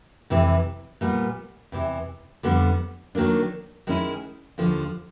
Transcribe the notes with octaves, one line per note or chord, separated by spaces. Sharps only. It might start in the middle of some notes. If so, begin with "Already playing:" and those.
F2 C3 E3
A#2 G3 B3
E2 C3 E3
F2 D3 G3 B3
D#3 F#3 A#3 D4
D#3 G#3 C#4 E4
D#2 D3 F3